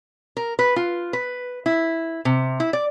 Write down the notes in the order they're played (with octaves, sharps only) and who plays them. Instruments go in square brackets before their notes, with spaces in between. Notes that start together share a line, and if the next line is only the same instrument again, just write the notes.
[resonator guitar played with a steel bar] A#4
B4
F4
B4
E4
C3
E4
D5